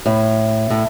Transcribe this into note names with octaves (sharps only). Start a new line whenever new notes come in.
A2
A2